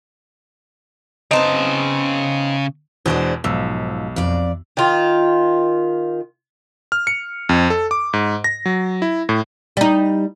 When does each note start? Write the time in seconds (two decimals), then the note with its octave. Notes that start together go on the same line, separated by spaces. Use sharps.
1.31 C#3 B3 C4 D#4 A5
3.06 E2 B2 G#3 D4 C5
3.44 B1 G#2 F3 E6
4.16 F2 D5
4.77 D#3 F4
6.92 F6
7.07 C#7
7.49 F2
7.70 A4
7.91 D6
8.13 G#2
8.44 A#6
8.66 F#3
9.02 E4
9.29 A2
9.77 G3 D#4